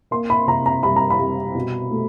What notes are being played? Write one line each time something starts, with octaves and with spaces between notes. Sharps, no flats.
A#3 C6
B5
C3 A#5
A#5
G3 B5
A#5
B5
G3
B2
A3